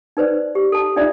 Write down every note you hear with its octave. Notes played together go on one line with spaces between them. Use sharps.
D#4 B4 C5 D5
G4
A4 A5
D4 D#4 F4 D5 E5